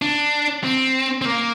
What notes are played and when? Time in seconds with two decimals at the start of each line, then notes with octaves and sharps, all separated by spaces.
0.02 D4
0.64 C4
1.22 C4
1.25 A#3